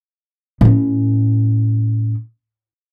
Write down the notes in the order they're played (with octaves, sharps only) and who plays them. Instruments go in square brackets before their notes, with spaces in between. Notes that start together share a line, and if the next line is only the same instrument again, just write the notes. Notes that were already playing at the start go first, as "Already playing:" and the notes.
[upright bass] A2 C#4